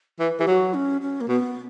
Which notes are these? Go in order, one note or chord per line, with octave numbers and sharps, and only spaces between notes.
E3 B4
E3 G4
F#3 F#4
C#4
C#4
A#3
B2 B3